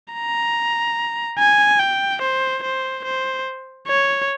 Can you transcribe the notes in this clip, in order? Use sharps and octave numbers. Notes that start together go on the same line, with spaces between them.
A#5
G#5
G5
C5
C5
C5
C#5